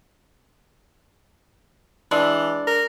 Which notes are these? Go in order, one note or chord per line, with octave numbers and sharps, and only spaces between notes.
E3 G#3 D4
A#4